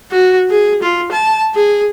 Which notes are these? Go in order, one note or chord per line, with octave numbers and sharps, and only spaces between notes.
F#4
G#4
F4
A5
G#4